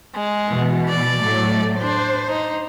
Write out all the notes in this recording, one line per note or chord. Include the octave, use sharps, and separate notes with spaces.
G#3
B2 E3
D5
A2 F#3 A3
D4 C5
D#4